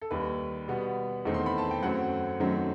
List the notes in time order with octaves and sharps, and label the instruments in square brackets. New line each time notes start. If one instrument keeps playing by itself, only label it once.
[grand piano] A4
D#2 D#3 G3 B4
B2 G3 B3
E2 D#3 A3 C4
C6
B5
A5
G5
F#2 F#3 A3 C4 F#5
F#2 D#3 F#3 A3 C4